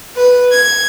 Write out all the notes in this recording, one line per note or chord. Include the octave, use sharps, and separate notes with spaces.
B4
G#6